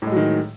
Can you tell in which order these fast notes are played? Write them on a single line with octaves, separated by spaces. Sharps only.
A2 G#3 F#3 D#3